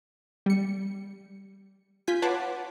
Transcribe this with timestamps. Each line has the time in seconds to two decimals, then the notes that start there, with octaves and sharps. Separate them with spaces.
0.46 G3 C#7
2.07 F4 G#5 G6 B6
2.22 B4 C#5 F#5 A5 C6 D6